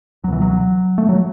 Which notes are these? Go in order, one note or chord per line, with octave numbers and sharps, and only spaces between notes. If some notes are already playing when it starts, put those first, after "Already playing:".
C#2 B2 F#3
E3
F#3
A3
F#3